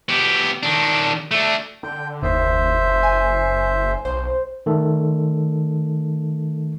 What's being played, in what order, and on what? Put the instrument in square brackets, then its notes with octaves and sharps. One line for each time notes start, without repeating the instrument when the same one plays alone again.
[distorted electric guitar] B3 G4
D#3 D4
A3 D4
[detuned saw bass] D3 [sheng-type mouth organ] G5
[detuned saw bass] F#1 [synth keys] D#2 [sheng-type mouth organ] C5 E5
[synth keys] G#5
[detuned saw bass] B1 [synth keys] C5
[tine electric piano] D#3 A3 A4